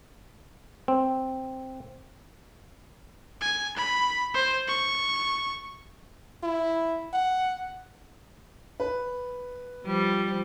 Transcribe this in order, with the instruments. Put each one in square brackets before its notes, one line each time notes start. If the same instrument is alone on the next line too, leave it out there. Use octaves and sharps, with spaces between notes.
[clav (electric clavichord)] C4
[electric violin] G#5
B5
C5
C#6
[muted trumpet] E4
F#5
[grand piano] B4
[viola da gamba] F3 G3